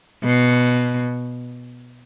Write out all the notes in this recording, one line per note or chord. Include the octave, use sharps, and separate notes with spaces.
B2